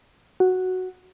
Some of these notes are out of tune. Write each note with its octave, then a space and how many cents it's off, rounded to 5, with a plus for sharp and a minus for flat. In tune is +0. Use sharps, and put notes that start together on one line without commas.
F#4 +0